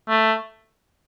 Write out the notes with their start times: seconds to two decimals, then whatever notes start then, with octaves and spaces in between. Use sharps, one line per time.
0.09 A3